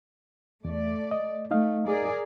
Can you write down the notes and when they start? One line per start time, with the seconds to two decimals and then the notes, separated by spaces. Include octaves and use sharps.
0.65 E2 A3 D5
1.11 D#5
1.51 A3 D#4 D#5 F5
1.87 G#4 A#4 D5